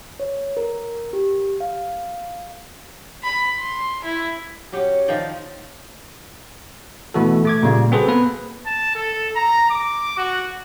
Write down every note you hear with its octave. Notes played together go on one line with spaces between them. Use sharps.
C#5
A#4
G4
F5
B5
C6
E4
F#3 C#4 G4
D#3 F3 D5 G5
B2 E3 A3 F#4 A4
A3 D6 G#6
A#2 C#3 G3 A#3
C4 F#4 G#4 A4 B4 C5
A#3 B3 B4
A5
A4
A#5
D6
F#4